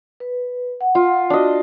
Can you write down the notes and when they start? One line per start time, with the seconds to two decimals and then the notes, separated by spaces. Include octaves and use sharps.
0.20 B4
0.81 F#5
0.95 F4
1.30 D4 F#4 D#5